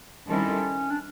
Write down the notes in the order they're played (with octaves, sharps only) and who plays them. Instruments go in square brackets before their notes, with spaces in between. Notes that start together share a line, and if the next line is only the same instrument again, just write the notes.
[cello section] D#3 G3 C4 E4 A4 [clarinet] C#4
[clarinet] D4